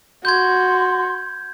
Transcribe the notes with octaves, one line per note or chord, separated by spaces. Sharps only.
F#4 C6 G6 G#6